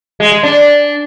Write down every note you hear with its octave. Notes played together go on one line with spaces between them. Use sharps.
G#3
G#3
D4